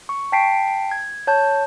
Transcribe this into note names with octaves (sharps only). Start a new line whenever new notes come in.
C#6
G5 A5 B6 C7 D7
G#6
C#5 A5 G6